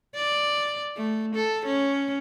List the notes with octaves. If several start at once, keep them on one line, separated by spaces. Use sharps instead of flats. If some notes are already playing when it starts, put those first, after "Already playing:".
D5
A3
A4
C#4